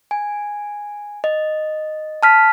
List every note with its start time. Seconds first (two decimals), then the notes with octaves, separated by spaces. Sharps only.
0.11 G#5
1.24 D#5
2.23 A5 F6 B6